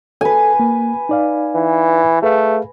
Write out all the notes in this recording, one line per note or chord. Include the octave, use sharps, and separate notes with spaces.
A4 B4 G#5
A#3
D#4 D5 F5
E3
A3 G#4 B4 F5